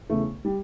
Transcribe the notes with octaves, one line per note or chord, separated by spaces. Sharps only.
E2 C#3 A3
G3